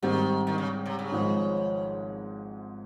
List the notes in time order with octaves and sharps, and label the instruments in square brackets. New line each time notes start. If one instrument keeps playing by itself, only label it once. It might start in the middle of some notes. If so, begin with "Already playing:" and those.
[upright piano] G#2 G3 C4 G4 [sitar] D#3
[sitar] D#3
C#3
C3
C#3
[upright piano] G#1 G#2 F3 G#3